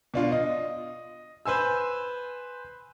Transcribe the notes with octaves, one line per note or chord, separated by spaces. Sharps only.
B2 D4 F4
D#5
B4 C5 G#5 E6